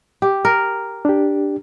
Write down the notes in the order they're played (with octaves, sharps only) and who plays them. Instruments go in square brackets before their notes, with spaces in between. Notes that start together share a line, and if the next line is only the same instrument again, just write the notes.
[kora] G4
A#4
[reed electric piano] D4 G4